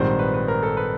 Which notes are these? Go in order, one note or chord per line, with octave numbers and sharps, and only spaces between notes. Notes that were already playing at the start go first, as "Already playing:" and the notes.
Already playing: A#1 G#2 D#3 G3 C4 C5
B4
B4
A#4
A4
B4